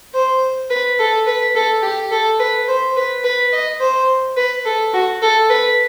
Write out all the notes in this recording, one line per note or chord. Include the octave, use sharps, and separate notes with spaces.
C5
B4
A4
B4
A4
G4
A4
B4
C5
B4
B4
D#5
C5
B4
A4
F#4
A4
B4